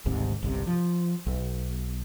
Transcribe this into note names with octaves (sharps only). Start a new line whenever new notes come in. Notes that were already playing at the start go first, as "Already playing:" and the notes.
G#1 D2 G#2 C3
G1 C2 C3
F3
B1